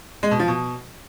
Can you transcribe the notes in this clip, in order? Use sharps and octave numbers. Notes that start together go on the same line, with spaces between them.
G#3
B2
F3
B2